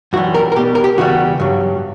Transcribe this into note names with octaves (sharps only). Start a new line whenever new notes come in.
F#2 E3 G3 F#4
A#4
A#4
B2 G3 G4
A#4
G4
E2 C#3 E3 G3 F#4
G2 F#3